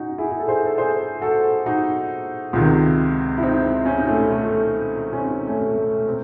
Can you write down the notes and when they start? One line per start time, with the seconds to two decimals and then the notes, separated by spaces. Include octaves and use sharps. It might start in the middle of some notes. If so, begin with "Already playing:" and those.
Already playing: C#4 D#4 F#4
0.18 E4 G#4
0.31 G#4
0.40 A4
0.48 G#4 C5
0.66 A4
0.78 G#4 C5
1.21 F#4 A4
1.66 D#4 F#4
2.53 C#2 C3 D#3
3.37 E4
3.42 C4 D#4
3.86 C#4
3.98 D#4
4.08 A3 C#4
4.31 A3
5.13 C#4
5.18 C4 D#4
5.47 A3 C#4
5.77 A3
6.07 C3 C4